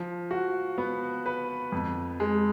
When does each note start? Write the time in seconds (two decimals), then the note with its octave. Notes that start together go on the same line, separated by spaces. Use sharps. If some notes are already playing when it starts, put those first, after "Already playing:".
Already playing: F3
0.31 F#4
0.78 B3
1.26 B4
1.72 F2
2.20 G#3